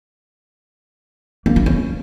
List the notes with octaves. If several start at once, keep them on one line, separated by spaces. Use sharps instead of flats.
A#3
E4
C#4